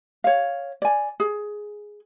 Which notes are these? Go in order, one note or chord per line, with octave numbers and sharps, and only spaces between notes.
C#5 F5
D5 G#5
G#4